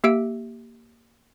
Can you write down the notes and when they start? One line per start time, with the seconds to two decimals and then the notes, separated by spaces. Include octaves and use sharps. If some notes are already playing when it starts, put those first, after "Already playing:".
0.04 A#3 G4 E5 E6 D7